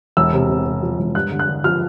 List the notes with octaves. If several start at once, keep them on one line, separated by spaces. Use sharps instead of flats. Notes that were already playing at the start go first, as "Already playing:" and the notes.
E1 E6
C3
C3
C3
F3
E1
G2 F#6
D3
F#6
D3
F3 F6